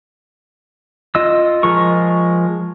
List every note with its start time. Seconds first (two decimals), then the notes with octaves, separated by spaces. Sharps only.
1.15 F4 D#5 E6
1.63 F3 G#3 A#4 C#6